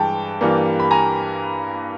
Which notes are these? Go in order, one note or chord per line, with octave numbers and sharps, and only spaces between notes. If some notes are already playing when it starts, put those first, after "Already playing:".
Already playing: G2 E3 G#3 G5 A5
G2 E3 G3 A#3
B5
G#5 A#5